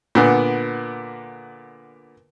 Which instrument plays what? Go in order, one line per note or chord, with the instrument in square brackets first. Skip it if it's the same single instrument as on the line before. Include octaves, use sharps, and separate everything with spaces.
[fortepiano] A#2 D3 B3